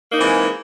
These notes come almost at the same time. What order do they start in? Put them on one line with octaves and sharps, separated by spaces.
A#3 D#4 C4 E3 G#3